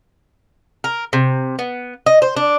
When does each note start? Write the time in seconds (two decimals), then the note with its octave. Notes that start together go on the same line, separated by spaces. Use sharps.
0.84 A#4
1.13 C3
1.59 B3
2.06 D#5
2.22 C5
2.37 D4